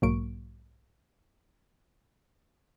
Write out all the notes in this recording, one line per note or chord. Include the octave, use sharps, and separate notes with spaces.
B1 G#2 F#3 A#3 C#6 D7